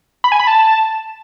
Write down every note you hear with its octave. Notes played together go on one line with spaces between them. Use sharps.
B5
G#5
B5
A5